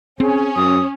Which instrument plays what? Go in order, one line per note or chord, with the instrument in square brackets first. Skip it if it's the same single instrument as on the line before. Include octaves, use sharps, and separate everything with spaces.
[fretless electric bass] C4 [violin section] C#4 [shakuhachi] G#4
[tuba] F#2 [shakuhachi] D#6